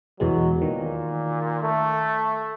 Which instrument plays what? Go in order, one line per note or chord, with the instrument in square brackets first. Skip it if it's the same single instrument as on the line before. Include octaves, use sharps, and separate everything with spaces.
[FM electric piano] E2 B2 G#3 [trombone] F#3
[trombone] A#2 [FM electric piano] D#3
[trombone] A3